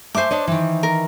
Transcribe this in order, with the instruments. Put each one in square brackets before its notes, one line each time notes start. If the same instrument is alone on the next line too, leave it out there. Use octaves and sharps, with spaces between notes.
[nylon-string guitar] A3 E5 G#5 [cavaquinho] C5 D6
[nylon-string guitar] D4 C#5 D#5
D#3 E3
[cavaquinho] A#4